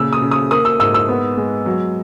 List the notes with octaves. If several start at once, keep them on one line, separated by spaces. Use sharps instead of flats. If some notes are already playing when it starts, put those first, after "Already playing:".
Already playing: A#2 C#3 E6
D#6
C#3
D#6
A#3 D#6
E6
G#2 E6
E6
B3
G#3
F#3